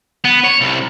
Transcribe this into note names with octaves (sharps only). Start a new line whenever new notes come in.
B3
C#5
C2